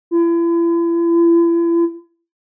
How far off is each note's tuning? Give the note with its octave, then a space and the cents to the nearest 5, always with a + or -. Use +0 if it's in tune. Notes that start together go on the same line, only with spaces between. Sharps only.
E4 +40